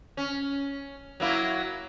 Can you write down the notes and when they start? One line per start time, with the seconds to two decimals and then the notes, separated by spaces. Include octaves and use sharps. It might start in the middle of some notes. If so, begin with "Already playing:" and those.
0.17 C#4
1.20 F#3 A#3 E4